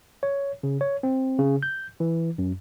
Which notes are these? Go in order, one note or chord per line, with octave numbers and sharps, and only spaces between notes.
C#5
C#3
C#5
C4
C#3
G6
E3
F#2